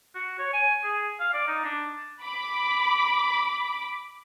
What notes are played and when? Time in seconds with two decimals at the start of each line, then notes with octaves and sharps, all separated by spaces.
0.15 F#4
0.39 C#5
0.53 G#5
0.84 G#4
1.20 F5
1.33 D5
1.48 D#4
1.64 D4
2.23 B5 D6